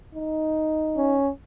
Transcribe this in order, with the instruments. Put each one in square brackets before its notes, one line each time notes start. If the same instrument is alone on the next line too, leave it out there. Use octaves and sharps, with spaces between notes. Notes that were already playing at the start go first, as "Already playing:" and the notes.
[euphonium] D#4
[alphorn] C#4